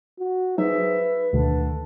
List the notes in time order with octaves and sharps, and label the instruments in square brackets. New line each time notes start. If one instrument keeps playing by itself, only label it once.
[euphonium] F#4
[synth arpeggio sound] F#3 D#4 [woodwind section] G#4 C5 E5 [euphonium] B4
[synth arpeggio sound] D2 B2 D#3 [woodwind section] D3 A3 D4